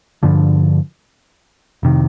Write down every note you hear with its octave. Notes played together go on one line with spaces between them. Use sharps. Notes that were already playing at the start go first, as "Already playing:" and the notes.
G2 D3 F3
F1 C3 D#3